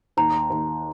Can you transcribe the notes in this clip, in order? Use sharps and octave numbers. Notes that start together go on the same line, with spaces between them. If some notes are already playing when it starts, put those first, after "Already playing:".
D#2 A#5
D#2